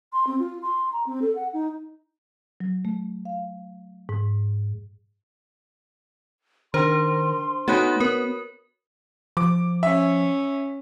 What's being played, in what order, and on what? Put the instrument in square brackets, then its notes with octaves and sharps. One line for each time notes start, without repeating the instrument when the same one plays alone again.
[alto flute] C6
C4
F4
C6
A#5
C4
A4
F#5
D#4
[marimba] F#3
A3
F5
G#2
[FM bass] D#3 [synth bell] D4 C5 [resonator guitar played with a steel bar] A#4 [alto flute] C6
[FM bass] A3 [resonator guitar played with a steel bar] B3 D#4 G#5 [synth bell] F#4 C#5 F#6
[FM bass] B3 [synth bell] A#4 [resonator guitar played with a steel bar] B4
[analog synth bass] F3 [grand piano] D6
[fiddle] C#4 [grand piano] E5